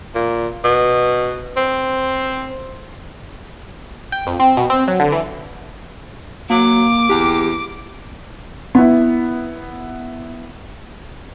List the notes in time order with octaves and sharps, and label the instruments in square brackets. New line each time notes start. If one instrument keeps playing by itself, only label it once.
[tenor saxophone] A#2
B2
C4
[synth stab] G5
F2
C4
B2
C4
F#3
D3
E3
[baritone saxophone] F#3 [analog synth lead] A#3 [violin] D6
[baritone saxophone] E2 [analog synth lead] G4
[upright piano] B3 E4